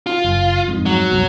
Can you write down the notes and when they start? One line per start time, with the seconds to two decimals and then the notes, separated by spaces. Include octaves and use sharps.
0.07 F4
0.25 F#1
0.68 F2 G#2
0.86 F#3
1.12 F1 C2 B2